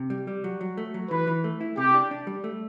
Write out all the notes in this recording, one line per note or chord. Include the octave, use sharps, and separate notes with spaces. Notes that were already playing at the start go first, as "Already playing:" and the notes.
Already playing: C3
G3
G3
F#3
F#3
A3
F#3
E3 B4
E3
A3
E4
C3 G4
D4
D4
G3
A3